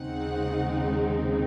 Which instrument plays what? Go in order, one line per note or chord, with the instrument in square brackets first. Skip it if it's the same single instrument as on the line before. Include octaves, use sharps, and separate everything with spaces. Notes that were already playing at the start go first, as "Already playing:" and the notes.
Already playing: [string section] D#2 C#3 G#3 C4 D#4 F#5